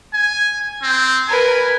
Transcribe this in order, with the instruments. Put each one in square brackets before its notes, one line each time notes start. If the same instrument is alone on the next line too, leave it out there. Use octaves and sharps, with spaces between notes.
[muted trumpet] G#5
C4
[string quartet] A#4 B4 [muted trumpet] G#5